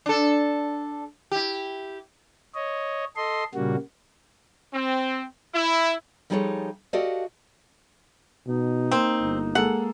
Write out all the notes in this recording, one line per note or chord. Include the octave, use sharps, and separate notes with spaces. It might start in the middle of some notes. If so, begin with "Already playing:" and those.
D4 A4
E4 G4
C#5 D#5
A4 D#5 C6
A#2 C#3 G3 A#3 F#4
C4
E4
F3 G3 D#4 G#4 A4 C#5
F#4 G4 A4 D5 D#5 F5
B2 D#4
A#3 C4
G1
G#3 A#3 A4 F#5